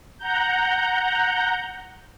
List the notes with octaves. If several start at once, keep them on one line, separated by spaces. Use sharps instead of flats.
F#5 A#5 G6